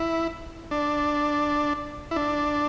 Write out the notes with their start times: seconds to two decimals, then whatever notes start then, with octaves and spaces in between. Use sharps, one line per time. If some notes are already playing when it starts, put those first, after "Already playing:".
Already playing: E4
0.71 D4
2.11 E4
2.16 D4